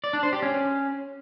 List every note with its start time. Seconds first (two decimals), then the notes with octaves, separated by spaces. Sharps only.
0.04 D5
0.13 D4
0.23 C5
0.33 G4
0.42 C#4